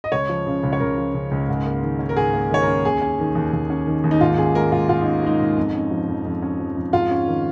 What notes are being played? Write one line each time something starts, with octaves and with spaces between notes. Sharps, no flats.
D#5
C#2 C#5
F3
C#3
C#2
C#5
C#2 A#4
F3
C#3
C#2
G#2
A#3
D#3
C#4
A#4
G#2 G#4
A#3
D#3 C#5
A#4
C#4
D#2 G#4
C#4
D#3
D#2
D#2
C#4
D#3
D#2
D#4
G#2 F4
C#4 G#4
G#3 A#4
G#2 F4
G#2 F4
C#4 D#4
G#3 D#4
G#2
F2
C#4
F3
F2
F2
C#4
F3
F2
G#2 F4
C#4
D#3